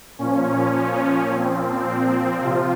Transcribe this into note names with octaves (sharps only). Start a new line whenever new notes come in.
A#2 F3 C#4
A#2 F3 C4
C4
C3 F3 F4